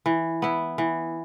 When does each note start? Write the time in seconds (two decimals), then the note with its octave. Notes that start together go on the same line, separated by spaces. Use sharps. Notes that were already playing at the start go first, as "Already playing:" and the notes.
0.06 E3
0.42 B3 E4
0.78 E3